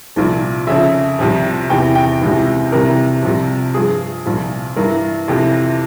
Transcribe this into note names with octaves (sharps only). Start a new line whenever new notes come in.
C2 A#2 F3
F2 C#3 F3 E5
C2 C3 F3
E2 C3 E3 G5
G5
C#2 C3 E3
C2 C3 E3 A#4
C2 C3 F3
G2 F3 G#4
C2 A#2 F3
G2 E3 A#4
F2 C3 E3